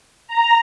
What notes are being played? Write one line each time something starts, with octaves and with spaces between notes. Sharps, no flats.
A#5